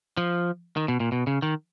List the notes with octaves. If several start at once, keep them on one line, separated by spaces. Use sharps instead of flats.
F3
D#3
B2
A#2
B2
C#3
D#3